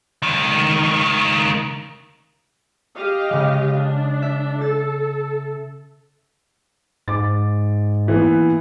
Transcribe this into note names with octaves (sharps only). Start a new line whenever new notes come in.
C#2 D#3
G4 D#5 F5
C#3 G#3
D4
E5
A4 A6
G#2 D6 A6
A#2 E3 B3